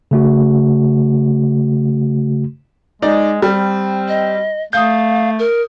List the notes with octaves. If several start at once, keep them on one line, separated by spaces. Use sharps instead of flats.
C#3 A3 F#4
G#3 D#4 D5
G3 C4
D#5
A3 F5 D#6 G6
A#4